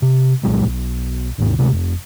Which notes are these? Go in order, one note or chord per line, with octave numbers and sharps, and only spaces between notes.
C3
C2 A#2 F#3 G#3
B1
A1 D#2 G#2 C3
D2 C3 G#3 A3
F1